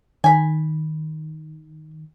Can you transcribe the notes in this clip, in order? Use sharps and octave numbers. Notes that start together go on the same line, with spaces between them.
D#3 G#5 B5